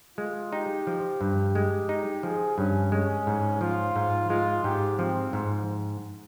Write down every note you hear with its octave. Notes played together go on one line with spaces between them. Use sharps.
G#3 F4
D#4 G4
F3
G2
G#3
D#4
F3 G#4
G2 C#4
G#3 C#4
G#2
F3 F4
G#2
G#3 F4
G#2 G4
F3 C4
G#2